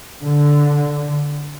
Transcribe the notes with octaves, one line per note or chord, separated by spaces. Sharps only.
D3